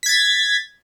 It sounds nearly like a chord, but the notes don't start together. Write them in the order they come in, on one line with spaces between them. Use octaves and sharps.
B6 G#6 A6